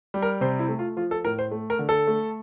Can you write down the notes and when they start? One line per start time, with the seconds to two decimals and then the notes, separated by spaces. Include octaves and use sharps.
0.14 G3
0.22 A#4
0.41 C3 C5
0.59 E4
0.68 A3
0.79 F4
0.97 F3 F4
1.11 A4
1.24 A2 A#4
1.39 C5
1.51 A3
1.70 A#4
1.79 D3
1.89 A4
2.07 A3